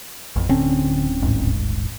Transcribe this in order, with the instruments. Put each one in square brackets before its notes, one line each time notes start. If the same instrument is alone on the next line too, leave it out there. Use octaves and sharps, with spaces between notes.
[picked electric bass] A1 F2
[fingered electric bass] D1 C4 C#4 [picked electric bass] D3
[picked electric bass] D#1 A1 G#2